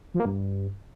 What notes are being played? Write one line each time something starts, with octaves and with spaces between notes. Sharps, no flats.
F3
A#3
G2